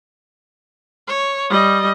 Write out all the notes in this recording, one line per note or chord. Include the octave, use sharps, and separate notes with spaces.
C#5
G3 D#5